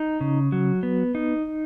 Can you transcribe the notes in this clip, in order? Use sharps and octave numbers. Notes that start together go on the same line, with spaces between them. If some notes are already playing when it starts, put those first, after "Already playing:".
Already playing: D#4
C#3
F#3
B3
D#4